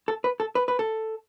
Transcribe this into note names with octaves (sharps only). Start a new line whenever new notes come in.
A4
B4
A4
B4
B4
A4